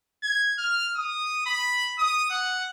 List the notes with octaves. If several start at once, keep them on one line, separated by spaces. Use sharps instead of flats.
G#6
F6
D#6
B5
D#6
F#5